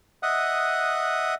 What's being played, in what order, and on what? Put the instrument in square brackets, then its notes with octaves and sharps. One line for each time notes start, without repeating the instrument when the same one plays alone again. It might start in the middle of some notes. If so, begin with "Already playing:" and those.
[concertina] D#5 E5 F#5 D#6 F#6